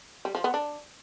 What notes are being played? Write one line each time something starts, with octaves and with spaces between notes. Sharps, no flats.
G3
F3
B3
D4